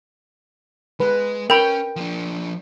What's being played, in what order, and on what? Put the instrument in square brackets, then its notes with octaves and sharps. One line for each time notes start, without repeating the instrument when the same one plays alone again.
[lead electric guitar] G#3 [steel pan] B4
[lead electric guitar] C#4 [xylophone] A#4 B5 [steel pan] G5
[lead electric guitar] F3 D4